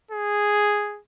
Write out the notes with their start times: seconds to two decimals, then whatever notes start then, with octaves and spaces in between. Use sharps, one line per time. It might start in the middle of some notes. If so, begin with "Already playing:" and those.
0.11 G#4